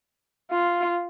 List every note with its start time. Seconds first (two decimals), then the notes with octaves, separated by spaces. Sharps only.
0.51 F4